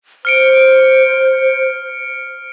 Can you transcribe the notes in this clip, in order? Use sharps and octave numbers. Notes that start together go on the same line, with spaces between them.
C5 F6 C#7 D7